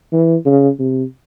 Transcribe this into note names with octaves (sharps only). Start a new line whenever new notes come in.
E3
C#3
C3